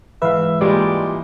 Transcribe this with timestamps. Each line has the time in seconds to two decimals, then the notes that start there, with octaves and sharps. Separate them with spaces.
0.22 G#2 E3 B4 E5 F5
0.61 A#2 G3 G#3 D5 G5 C6 C#6